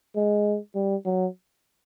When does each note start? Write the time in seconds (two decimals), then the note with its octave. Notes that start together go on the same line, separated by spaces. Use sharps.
0.16 G#3
0.75 G3
1.05 F#3